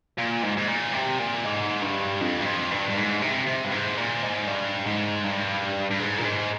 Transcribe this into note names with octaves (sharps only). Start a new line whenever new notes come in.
A#2
G#2
G#2
A#2
C3
A#2
G#2
G2
F2
G2
F2
G2
G2
G#2
C3
C3
G2
G#2
A#2
G#2
G2
G#2
G2
G2
G#2
A#2
G#2